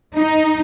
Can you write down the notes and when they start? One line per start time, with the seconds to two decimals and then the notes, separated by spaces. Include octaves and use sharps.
0.16 D#4